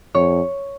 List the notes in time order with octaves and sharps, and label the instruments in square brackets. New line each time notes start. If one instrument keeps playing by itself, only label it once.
[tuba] F2 [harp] C#5